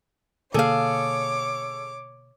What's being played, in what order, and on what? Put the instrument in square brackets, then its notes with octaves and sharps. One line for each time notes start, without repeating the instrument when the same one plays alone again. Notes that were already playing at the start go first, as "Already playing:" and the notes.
[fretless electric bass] B2 D3 A#3 [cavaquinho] G#4 F5 [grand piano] A4 [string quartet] C#5 D6